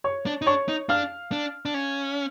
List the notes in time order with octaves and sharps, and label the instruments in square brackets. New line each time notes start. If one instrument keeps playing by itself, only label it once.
[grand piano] C#5 C#6
[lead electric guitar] D4
D#4
[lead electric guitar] D4 [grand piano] C#5 C#6
[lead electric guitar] D#4
[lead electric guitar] D4 [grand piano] F5 F6
[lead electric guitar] D4
D4
C#4